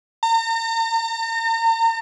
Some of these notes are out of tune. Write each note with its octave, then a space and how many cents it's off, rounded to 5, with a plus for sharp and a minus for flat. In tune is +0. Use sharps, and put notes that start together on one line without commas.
A#5 -40